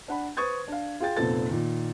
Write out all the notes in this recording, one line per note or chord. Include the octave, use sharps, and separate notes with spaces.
D4 F#5 B5
B4 C5 C#6 D#6 G#6 A6
D4 F5
F4 G#4 G5 A6
F1 A#2 B3 C4 A4 A6
A#2 D#3